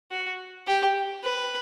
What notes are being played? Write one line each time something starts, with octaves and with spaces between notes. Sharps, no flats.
F#4
G4
B4